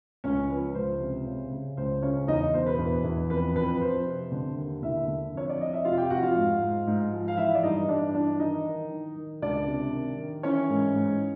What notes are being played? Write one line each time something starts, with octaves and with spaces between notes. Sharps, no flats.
C#2 C#4 C#5
F3 B4
C#2 C5
C3
C#3
C#3
C#2 C5
C#3 C#4 C#5
E2 D#4 D#5
B2 C5
B4
E2
E2
F2 B4
F2 B4
F2 C5
C3
D3
D#2
D3 E4 E5
D3
F2 C#5
D5
F2 D#5
E5
C3 F4 F5
G4 G5
F2 F#4 F#5
F4 F5
G#2
G#2
G#2
F3
F5
E3 E4 E5
D5
G2 D#4 D#5
G2 D4 D5
E3 D4 D5
D#3 D#4 D#5
D#3
D#3
D#3
C#2 D4 D5
C3
D#3
D#3
E3 C#4 C#5
G#2
G#2